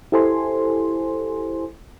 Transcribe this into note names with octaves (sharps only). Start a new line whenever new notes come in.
E4 G4 A4 C5 G#5 C6